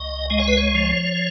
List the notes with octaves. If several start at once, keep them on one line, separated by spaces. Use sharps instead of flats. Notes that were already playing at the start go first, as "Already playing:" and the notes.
Already playing: C#2 D#5
G#3 D#5
C#5
B4
C#5
F3